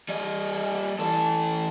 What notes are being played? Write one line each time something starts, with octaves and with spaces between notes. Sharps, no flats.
G3 D#5
E3 A4